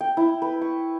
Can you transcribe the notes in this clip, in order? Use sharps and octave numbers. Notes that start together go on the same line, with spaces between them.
G5
E4
B4
C#6